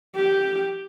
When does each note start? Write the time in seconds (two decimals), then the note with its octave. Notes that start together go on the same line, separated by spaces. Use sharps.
0.16 G4